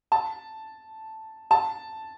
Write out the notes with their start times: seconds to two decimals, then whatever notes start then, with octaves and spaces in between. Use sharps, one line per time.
0.12 A5
1.51 A5